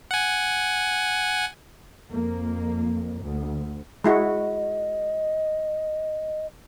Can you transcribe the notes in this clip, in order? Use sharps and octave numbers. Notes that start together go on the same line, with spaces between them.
F#5 G#5
F2 A#3
D2
G#3 E4 F#4 D#5